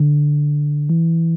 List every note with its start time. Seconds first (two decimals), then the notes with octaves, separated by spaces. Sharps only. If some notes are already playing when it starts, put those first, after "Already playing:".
Already playing: D3
0.89 E3